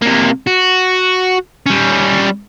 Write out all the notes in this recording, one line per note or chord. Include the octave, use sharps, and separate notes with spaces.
C3 A#3
F#4
G3 C#4